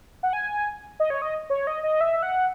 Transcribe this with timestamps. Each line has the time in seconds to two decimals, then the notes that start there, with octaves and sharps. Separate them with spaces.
0.23 F#5
0.33 G#5
1.00 D#5
1.10 C#5
1.22 D#5
1.50 C#5
1.67 D#5
1.83 D#5
2.01 E5
2.23 F#5